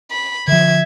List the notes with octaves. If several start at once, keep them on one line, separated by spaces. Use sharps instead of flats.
B5
D3 F3 E5 G#6